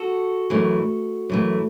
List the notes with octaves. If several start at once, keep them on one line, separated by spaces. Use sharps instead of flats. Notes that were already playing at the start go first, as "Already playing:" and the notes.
Already playing: F#4 A4
F#2 E3 A3
F#2 E3 A3